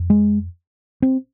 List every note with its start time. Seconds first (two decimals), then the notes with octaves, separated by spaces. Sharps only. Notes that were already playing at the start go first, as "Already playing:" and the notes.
Already playing: F2
0.10 G#3
1.02 C4